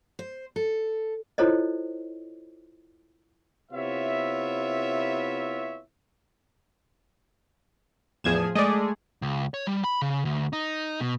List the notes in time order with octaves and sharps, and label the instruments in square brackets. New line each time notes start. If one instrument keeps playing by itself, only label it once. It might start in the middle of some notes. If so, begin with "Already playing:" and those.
[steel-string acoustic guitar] C5
A4
[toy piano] E4 F4 A4 C5 C#5 D#5
[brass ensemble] C3 B3 E4 F4 C#5 E5
[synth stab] E2 G#6 E7 [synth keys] A2 F3 G#4
[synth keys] G#3 A3 G#4 [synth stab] D5 D#5
[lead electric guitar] C#2
C#5
G3
B5
C#3
D2
D#4
B2